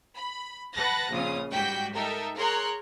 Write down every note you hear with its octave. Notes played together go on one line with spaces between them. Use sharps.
B5
B4 F#5 A5 F#6 A6 A#6
A#1 C#3 C#4 F4 D#6
G#2 G3 F#4 G5 G6 B6
D#4 A4 A#4 E5 G5
G#4 A#4 C#5 A#5 C6 F#6